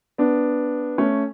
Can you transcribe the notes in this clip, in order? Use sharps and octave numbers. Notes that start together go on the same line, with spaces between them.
B3 D4
A3 C#4